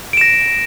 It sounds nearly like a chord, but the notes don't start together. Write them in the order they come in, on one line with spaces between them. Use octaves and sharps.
D7 E7 A#6